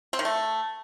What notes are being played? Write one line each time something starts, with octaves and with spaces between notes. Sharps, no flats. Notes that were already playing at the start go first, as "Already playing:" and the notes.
C4
D#3
A3